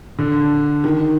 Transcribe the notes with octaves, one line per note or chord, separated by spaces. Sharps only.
D3
D#3